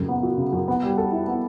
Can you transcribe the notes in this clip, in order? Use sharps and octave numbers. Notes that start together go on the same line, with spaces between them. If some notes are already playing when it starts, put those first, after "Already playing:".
Already playing: F#2 A#2 C#3
B3
F#3
C#3
F#2
B3
G3
A4
E4
B3